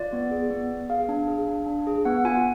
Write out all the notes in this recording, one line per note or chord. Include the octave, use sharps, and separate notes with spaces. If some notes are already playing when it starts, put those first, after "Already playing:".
Already playing: F4 D5
B3
G#4
B3
B3
G#4 F5
D4
G#4
D4
D4
G#4
B3 F#5
F4 G#5